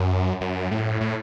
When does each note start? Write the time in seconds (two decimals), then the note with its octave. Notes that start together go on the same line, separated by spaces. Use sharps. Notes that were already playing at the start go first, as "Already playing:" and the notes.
Already playing: F#2
0.41 F#2
0.71 A2
1.01 A2